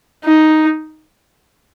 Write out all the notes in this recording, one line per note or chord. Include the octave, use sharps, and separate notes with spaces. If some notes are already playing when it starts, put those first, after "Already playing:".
D#4